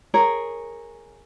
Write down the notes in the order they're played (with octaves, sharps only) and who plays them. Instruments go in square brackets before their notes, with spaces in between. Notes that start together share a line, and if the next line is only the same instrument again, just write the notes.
[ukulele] G#4 A#4 C#5